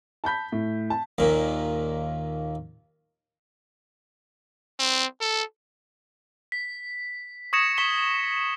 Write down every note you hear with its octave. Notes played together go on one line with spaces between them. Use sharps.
A5 B5 G6 B6
A2
A5
D#2 A#2
C4
A4
B6
C#6 D#6 G#6 A#6 C#7 E7
C#6 B6 E7 G7